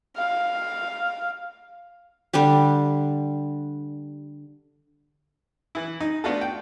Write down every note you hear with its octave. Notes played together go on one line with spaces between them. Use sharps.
F5
D3 G3 D4 G4
E3 E4
D#4
A3 B3 D4 F4 F#4 A4
G5